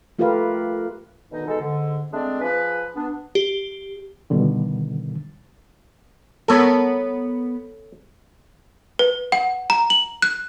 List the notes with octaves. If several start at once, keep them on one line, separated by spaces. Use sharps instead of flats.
A3 F4 G4 A#4 B4 F5
D2 B2 D#3 D#4
B2 G#3 D#4 A4
G#2 D3
G#3 A3 C4 D4 D5
F3 G#4 B4
B3 D4
G4
D2 G2 B2 D3 D#3
B3 A4 A#4 C#5
B4
F#5
A#5
F#7
F#6